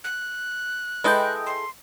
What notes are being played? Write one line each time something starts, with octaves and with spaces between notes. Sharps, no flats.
F#6
G#3 E4 A4 B4 D#5 G5
C6